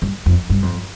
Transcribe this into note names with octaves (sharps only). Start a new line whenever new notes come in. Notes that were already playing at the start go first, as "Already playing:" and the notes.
G2
F2
G2
F2